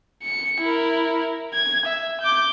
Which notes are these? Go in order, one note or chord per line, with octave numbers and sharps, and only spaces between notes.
C#7
E4 A#4
G#6
E5
D6 G6